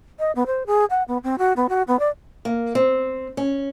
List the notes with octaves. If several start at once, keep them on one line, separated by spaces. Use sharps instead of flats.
D#5
B3
C5
G#4
F#5
B3
C4
F#4
B3
F#4
B3
D5
A#3
C4
C#4